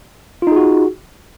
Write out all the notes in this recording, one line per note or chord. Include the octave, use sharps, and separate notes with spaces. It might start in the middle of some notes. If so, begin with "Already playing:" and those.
D#4 F4 F#4 G#4